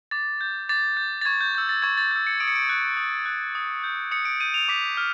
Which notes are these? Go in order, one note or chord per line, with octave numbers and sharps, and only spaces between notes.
D6 A6
G6
D6 A6
G6
A6
C#6 G#6
G6
E6 G6
A6
C#6 G#6
A6
E6 G6
C#7
D#6 D7
C#7
D7
F#6
D#6
F#6
D#6
G6
D#6 C#7
D7
G6 D#7
F7
D6 B6
F6